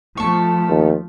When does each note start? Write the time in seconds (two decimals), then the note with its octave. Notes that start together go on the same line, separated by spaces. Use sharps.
0.17 F3 A3 A4 C#6
0.70 D#2